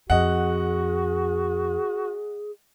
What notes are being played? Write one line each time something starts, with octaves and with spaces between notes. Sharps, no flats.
F2 F#4 G#4 D#5 F#5